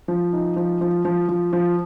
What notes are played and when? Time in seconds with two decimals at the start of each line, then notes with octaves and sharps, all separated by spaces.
0.08 F3
0.33 D#4
0.56 F3
0.81 F3
1.05 F3
1.29 F3
1.53 F3